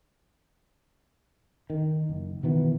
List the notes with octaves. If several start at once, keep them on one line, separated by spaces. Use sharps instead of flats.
D#3
F#1
B2 D#3 E3 B3